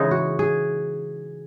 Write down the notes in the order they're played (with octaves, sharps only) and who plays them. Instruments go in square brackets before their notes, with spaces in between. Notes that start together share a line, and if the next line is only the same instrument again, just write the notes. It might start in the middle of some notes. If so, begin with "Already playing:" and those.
Already playing: [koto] C#3 E3 G#3 D#4 [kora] G#4
[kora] F#4
G#4